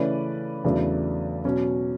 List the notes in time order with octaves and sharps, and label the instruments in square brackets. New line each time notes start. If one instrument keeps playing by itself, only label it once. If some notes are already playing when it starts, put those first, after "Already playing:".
Already playing: [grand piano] C#3 E3 A3 C#4 B4 D5
E2 C#3 F#3 A3 D4
B2 F#3 C#4